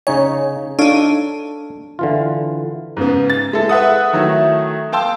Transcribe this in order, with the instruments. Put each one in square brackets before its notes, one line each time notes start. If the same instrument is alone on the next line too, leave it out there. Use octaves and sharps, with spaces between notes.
[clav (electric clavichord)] C#3 D#4 G#5 [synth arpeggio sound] C#5
[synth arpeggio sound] D4 D#4 [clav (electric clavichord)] A4 C#5 F5
[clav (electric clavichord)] D3 E3 F4
[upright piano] G#2 C#3 B3
A6
G#3 E4 A4
B4 E5 F#5 D#6
D#3 F#3 A3 E4
F5 G5 A5 C6 E6